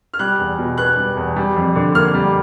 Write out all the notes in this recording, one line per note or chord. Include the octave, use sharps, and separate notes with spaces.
F6
G3 F#6
E2
B2
B3 F#6
G3
E2
G3
F2
D3
A#3 F6
G3